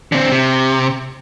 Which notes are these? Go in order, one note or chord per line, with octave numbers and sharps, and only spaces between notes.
D3 C4
C3